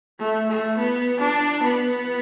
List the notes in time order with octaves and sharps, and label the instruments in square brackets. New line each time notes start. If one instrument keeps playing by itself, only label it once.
[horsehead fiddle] A3
A3
B3
D4
B3